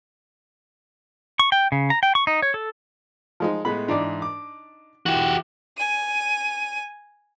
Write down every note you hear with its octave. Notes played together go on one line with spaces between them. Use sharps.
C#6
G5
C#3
A#5
G5
C#6
D#4
C#5
A4
F3 G#3 D#4
A2 G#3 B3 B5
G#2 E3 D4 D#4 D5
D6
E3 F#4 G4
G#5 D#7